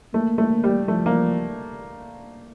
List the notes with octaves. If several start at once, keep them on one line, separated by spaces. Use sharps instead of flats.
A3 A#3
A3
G3
F3 A3
A#3